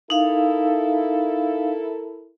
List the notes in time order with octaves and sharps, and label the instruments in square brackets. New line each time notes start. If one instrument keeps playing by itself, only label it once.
[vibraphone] D#4 F5 [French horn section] E4 A4 A#4